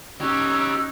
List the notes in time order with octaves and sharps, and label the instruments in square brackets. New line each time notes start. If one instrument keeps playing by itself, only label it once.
[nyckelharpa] C#4 D#4 [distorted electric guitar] G4 C#5 [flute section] E6 F#6 G#6